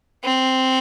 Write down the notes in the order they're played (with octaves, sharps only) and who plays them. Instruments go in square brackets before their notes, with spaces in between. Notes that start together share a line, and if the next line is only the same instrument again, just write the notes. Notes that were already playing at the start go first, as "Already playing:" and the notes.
[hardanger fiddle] C4